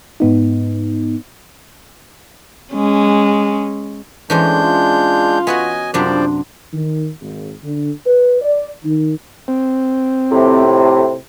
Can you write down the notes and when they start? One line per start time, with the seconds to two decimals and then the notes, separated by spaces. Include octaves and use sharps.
0.20 G#2 B3 D#4
2.73 G#3 C#4
4.30 A2 E3 G#3 C#4 D4 C5 G6
4.63 F4
5.47 B3 F#4 C#5 D#5 G#5
5.94 F#2 C3 F3 G3 D4 C5 D5
6.73 D#3
7.21 G#1
7.63 D3
8.06 B4
8.42 D5
8.85 D#3
9.48 C4
10.31 F2 A2 C3